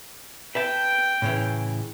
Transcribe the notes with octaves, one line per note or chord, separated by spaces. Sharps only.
B4 E5 G5 A5
A2 C#3 E3